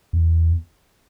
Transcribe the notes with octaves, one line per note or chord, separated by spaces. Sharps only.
E2